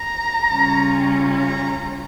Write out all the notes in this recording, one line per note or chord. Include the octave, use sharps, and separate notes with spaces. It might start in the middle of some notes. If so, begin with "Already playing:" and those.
Already playing: A#5
C#3 G3 C#4 F4
A#5